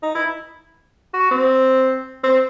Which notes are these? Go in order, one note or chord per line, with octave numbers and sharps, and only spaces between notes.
D#4
E4
F#4
C4
C4